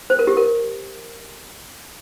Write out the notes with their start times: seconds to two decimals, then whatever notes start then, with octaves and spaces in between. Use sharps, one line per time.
0.10 C5
0.19 A#4
0.27 G4
0.37 A#4